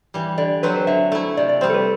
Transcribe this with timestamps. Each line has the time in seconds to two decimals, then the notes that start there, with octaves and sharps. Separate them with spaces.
0.14 E3 G3
0.38 D3 D5
0.63 F#3 C4 F#4 B4
0.75 C5
0.87 D3 E5
1.12 A3 E4
1.37 C3 D5
1.49 D5
1.61 G3 C4 C5
1.70 A4
1.74 B4